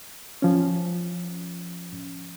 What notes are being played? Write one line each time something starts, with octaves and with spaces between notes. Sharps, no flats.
F3 C#4